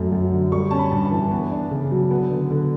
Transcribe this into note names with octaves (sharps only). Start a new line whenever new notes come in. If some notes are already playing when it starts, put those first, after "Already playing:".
Already playing: F#2 A3
F#2
D3
G3 C#6
C#4 A5
B5
G2
A5
E3
B3
D4
C#3
F#3
B3
D3
D3